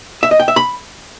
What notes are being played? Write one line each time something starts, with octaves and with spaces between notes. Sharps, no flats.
E5
D#5
G5
E5
B5